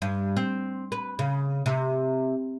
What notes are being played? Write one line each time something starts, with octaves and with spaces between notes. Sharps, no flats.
G2
C4
B4
C#3
C3